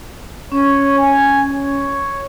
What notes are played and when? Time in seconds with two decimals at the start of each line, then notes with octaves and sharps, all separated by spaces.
0.52 C#4 C#5
0.98 G#5
1.50 C#5